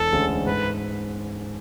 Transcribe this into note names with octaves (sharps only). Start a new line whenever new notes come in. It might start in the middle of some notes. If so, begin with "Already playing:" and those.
Already playing: E1 A4
D2 D3 G#3 C#4
G#2 B4